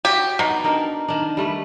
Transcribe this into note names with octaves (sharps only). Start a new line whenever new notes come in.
F#4 G4
B2 D#4 D5
D4 D#4 A#4
D#3 D4
G3 A3 B4